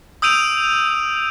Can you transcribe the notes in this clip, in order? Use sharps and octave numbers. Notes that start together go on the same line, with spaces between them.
D#6 E6 G6 D7 D#7 F7